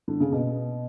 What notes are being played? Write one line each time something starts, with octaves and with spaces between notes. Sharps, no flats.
D3
C#3
B2